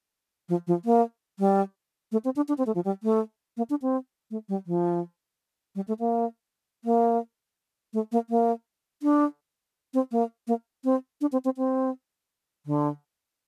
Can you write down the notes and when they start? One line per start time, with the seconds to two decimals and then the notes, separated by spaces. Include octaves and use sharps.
0.49 F3
0.67 F3
0.85 A#3
1.39 G3
2.12 A3
2.25 C4
2.36 D4
2.48 D4
2.58 C4
2.67 A3
2.75 F3
2.85 G3
3.03 A3
3.57 A#3
3.70 D4
3.82 C4
4.31 A3
4.49 G3
4.67 F3
5.75 G3
5.88 A3
6.00 A#3
6.85 A#3
7.93 A3
8.12 A#3
8.30 A#3
9.03 D4
9.94 C4
10.12 A#3
10.47 A#3
10.84 C4
11.21 D4
11.32 C4
11.45 C4
11.57 C4
12.66 D3